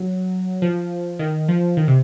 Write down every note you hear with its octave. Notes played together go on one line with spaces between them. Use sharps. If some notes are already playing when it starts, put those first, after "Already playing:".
Already playing: F#3
F3
D#3
F3
D#3
C3